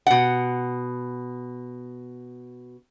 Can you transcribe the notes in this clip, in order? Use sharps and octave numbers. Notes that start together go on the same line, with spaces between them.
B2 F#5